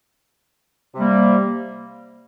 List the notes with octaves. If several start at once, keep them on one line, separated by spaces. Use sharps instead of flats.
C3 G3 A#3